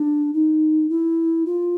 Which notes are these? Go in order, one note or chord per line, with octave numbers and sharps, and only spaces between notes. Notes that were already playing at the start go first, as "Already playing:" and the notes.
Already playing: D4
D#4
E4
F4